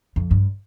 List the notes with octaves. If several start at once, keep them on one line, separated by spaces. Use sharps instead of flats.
F2
G2